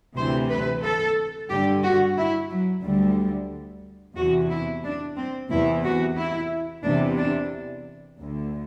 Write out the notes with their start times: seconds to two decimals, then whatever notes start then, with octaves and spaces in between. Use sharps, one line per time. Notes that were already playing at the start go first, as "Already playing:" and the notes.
0.16 D2 C3 E3 C5
0.49 B4
0.84 A4
1.50 G2 D3 G4
1.83 F#4
2.17 E4
2.50 F#3
2.83 D2 D3 G3
4.16 E2 C3 E3 F#4
4.50 E4
4.84 D4
5.17 C4
5.50 E2 C3 E3 E4
5.84 F#4
6.16 E4
6.83 E2 C3 E3 D4
7.17 D4
8.17 D2 D3